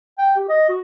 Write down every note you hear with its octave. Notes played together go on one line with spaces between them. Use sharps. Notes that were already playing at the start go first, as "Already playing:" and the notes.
G5
G4
D#5
F#4